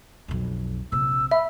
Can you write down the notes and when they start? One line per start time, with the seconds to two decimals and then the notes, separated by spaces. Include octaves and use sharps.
0.28 B1 F2
0.92 A#1 C3 E6
1.31 E5 B5